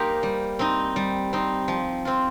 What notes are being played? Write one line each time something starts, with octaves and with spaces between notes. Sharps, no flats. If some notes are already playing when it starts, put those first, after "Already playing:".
Already playing: A#3 D#4 G4 C5
G3
C4 D#4
G3
C4 D#4
F3
C4 F4